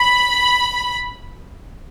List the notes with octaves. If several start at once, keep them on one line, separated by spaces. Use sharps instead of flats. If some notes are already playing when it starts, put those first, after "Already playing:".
Already playing: B5